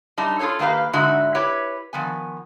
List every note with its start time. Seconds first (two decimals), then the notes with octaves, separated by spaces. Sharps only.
0.17 F#2 G3 D#4 A5
0.39 F4 F#4 G#4 A4 C#5
0.59 D#3 A#3 G4 B4 F5
0.93 G#2 D3 D#4 F#4 E5
1.35 E4 G4 B4 C#5
1.93 D#3 F3 B3 G#5